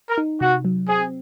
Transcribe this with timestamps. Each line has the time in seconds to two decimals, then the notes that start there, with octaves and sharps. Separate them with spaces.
0.10 A#4
0.18 D#4
0.41 C3 F#4
0.65 F#3
0.89 C4 G#4